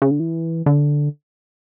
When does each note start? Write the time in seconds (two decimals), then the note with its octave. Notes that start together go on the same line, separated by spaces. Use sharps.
0.02 C#3
0.11 D3
0.20 E3
0.66 D3